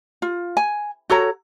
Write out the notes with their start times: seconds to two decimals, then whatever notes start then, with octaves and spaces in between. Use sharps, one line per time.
0.22 F4
0.57 G#5
1.10 F#4 A4 C#5 A#5